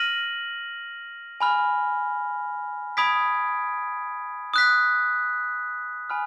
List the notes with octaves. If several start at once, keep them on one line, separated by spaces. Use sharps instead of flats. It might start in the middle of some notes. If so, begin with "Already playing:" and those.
Already playing: F6 A#6 D#7 F#7
G#5 B5 F6
B5 D#6 G#6 B6 D7
D#6 F#6 B6
G#5 B5 F6